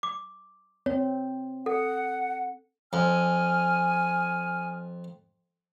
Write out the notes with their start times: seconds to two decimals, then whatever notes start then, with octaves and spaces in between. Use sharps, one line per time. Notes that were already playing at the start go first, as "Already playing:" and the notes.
0.03 D6
0.86 C4 C#5
1.66 A4 F#5
2.93 F2 G#5 D#6 F6